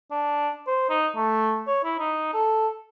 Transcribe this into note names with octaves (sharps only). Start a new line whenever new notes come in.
D4
C5
D#4
A3
C#5
E4
D#4
A4